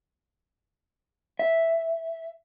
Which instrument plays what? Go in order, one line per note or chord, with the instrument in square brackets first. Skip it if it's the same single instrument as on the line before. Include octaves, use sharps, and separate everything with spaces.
[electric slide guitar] E5